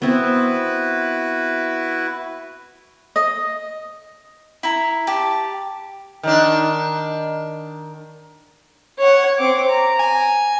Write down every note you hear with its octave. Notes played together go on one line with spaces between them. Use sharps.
B3 C4 E4 F#4 B4
D#5
E4 A#5
G4 A5
D#3 D4
C#5 F#5
C4 D6
A#5
G#5